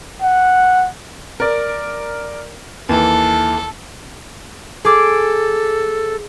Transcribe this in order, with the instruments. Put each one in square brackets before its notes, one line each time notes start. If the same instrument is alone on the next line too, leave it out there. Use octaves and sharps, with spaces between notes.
[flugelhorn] F#5
[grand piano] A#4 D5
[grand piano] D#2 E3 [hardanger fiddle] A4
[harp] G#4 D6 [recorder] A4